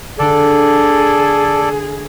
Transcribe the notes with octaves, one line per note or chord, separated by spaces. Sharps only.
D3 D4 G#4 A4 D5